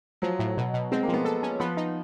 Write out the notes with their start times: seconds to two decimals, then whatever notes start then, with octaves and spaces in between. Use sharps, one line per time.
0.22 F3 F#3
0.39 A2
0.57 B2
0.74 B2
0.92 G#3 C4
1.03 A#3
1.08 F3
1.14 B3
1.25 A4
1.43 C#4
1.60 F3 B3
1.77 D#4